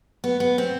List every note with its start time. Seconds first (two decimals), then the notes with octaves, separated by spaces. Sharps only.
0.24 B3
0.40 B3
0.58 C4